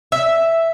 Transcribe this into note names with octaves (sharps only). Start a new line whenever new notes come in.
E5